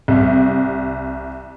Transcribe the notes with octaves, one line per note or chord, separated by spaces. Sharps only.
C2